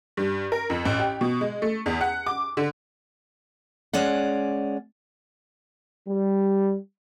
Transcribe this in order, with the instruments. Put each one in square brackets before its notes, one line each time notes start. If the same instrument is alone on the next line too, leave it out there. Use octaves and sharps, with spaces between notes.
[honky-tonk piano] G2
A#4
F2
A1
G4
B2
G#3
A3
E2
F#5
D6
D3
[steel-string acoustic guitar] G#3 C#4 D5 F#5
[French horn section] G3